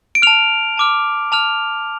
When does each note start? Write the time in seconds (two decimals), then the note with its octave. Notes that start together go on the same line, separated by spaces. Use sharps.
0.15 D7
0.22 A5 F6 F7
0.77 A5 D6 F6
1.32 A5 F6 F7